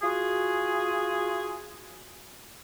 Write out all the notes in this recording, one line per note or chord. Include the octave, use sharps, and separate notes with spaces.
F4 F#4 G#4